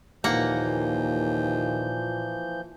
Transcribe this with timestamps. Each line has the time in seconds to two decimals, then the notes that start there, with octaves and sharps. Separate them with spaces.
0.24 D#2 A#2 E3 F3 A#3 F#5 A#5 G6